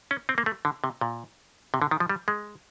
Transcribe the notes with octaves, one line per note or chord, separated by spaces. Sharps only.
C#4
C4
A#3
A3
D3
C3
A#2
C3
D3
D#3
F3
G3
G#3